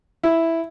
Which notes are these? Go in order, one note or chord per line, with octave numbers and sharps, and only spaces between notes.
E4